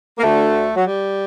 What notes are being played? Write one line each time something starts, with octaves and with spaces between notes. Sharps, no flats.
A#3
D2 D3 A3
F#3
G3